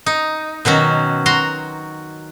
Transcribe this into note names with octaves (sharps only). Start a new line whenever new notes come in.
D#4
B2 D#3 F#3 C#4
F#4 A#5 C6